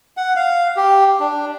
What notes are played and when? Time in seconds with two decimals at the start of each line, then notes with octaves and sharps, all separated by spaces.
0.17 F#5
0.36 F5
0.76 G4
1.20 D4